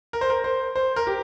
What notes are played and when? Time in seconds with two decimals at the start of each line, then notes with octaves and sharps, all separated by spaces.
0.13 A#4
0.21 C5
0.30 A#4
0.44 C5
0.76 C5
0.96 A#4
1.07 G4